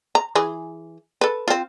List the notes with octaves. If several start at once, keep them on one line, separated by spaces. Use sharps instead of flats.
A#5
E3 G#4
A4 B4
C4 F4